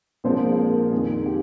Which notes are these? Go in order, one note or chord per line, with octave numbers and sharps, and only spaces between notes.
A#1 A#2 F3 G#3 C4 C5
A#4
F2 D#3 G#3 C4 G#4
G4